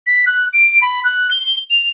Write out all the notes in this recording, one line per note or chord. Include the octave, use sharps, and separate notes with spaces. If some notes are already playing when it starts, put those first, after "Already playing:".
B6
F#6
D7
B5
F#6
G7
F7